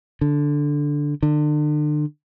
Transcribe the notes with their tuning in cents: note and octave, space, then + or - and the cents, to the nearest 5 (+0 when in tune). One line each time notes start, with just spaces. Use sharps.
D3 -5
D3 +35